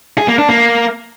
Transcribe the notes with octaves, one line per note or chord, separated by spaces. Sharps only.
G#4
A#3
D4
A#3